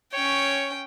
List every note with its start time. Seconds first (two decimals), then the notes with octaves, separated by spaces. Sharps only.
0.14 C#4 C#5 G5